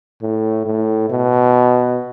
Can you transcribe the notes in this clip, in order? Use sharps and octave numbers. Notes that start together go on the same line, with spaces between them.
A2
A2
B2